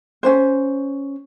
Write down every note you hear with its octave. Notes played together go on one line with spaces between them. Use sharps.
C#4 D4 C5